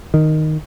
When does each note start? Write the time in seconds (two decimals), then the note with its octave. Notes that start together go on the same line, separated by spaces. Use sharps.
0.14 D#3